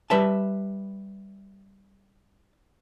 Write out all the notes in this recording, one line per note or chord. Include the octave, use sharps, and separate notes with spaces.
G3 B4 E5 A5